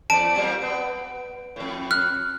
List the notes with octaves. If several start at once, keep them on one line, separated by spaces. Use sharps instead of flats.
E2 D5 A5 D7
F#3 A#3 C4
B3
F2 A2
F6 F#6